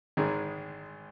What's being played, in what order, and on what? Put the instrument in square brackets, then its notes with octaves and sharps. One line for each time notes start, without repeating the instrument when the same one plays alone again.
[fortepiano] G#1 G#2 D#3 G#3